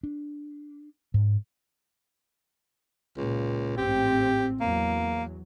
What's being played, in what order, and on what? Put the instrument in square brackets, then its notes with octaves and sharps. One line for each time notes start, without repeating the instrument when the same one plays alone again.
[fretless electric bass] D4
G#2
[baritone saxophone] C#2 [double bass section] A#2
[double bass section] A1 G#2 C4 [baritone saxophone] G4
[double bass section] E2 F#3 [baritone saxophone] A#3